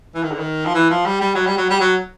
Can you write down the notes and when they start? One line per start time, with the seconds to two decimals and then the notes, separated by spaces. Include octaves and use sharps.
0.15 E3
0.23 D#3
0.31 D3
0.38 D#3
0.65 F3
0.74 E3
0.90 F3
1.05 G3
1.21 G3
1.35 F#3
1.46 G3
1.57 F#3
1.70 G3
1.80 F#3